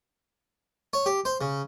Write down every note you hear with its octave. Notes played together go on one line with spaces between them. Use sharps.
C#5
G4
C5
C#3